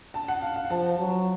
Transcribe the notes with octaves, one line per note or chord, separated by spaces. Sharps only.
A5
F#5
F5
F5
F3 A5
F#3